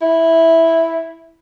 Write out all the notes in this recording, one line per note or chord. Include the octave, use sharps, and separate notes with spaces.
E4